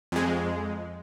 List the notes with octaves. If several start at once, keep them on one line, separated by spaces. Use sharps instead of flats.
F2 G#3